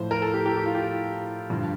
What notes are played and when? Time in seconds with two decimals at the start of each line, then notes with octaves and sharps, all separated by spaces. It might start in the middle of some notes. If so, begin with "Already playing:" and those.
Already playing: A2 F3 C5
0.11 A#4
0.22 A4
0.34 G4
0.46 G4
0.57 G4
0.66 F4
0.75 G4
1.50 G2 D3 F3